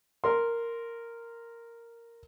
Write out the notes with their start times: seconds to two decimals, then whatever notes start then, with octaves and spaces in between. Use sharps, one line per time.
0.24 A#4 C6